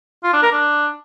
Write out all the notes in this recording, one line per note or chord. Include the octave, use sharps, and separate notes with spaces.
F4
D4
A#4
D4